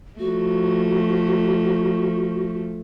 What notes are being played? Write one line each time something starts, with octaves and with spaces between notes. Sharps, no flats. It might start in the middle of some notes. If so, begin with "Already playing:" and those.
F3 A3 F#4